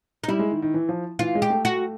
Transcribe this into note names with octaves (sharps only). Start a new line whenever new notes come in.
D#4
G3 E4
G#3
D#3
D#3
E3
F3
E3 F4
G#3
G4
A3
F#4